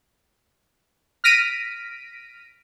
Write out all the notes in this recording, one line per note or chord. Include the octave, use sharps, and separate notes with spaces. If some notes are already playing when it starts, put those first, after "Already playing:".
F6 A#6 B6 D7 D#7